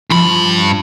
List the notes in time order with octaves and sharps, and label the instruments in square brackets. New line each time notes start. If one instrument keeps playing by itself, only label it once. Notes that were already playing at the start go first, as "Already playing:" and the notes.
[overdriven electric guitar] G2 B5 [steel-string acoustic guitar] F3